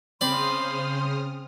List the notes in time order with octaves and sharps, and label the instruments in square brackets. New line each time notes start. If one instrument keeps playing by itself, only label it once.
[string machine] C#3 D#6 F6 [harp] C4 [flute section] C5 C6 [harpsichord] D5 B5